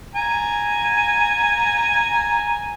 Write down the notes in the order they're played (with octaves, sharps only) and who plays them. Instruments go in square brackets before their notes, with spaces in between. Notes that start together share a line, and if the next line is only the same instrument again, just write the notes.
[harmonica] G#5 A#5